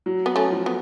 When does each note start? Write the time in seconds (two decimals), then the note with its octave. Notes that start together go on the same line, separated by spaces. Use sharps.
0.06 F#3
0.26 B3
0.36 A3 C#4
0.52 F3
0.66 B3